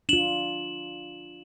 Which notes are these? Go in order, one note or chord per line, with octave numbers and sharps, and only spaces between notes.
D4 F4 E7 F#7